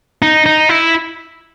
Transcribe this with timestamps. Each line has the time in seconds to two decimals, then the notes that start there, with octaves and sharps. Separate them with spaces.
0.22 D#4
0.46 D#4
0.69 E4